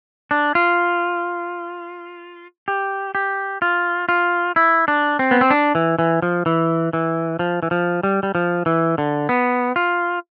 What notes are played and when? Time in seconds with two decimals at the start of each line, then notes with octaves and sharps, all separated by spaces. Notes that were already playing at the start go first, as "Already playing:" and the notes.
0.31 D4
0.55 F4
2.68 G4
3.15 G4
3.62 F4
4.09 F4
4.56 E4
4.88 D4
5.19 C4
5.31 B3
5.41 C4
5.50 D4
5.75 E3
5.99 E3
6.22 F3
6.46 E3
6.93 E3
7.39 F3
7.63 E3
7.71 F3
8.03 G3
8.23 G3
8.35 F3
8.66 E3
8.98 D3
9.29 B3
9.76 F4